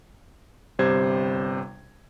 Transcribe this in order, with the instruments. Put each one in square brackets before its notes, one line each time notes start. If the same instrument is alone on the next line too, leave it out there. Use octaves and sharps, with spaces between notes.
[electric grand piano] G1 C3 G3 C5 G#6